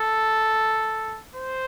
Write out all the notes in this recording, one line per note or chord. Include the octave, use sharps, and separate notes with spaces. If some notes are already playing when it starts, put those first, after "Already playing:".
Already playing: A4
C5